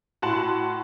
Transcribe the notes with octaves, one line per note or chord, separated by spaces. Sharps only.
A2 F#4 F#5 A5 C6 F#7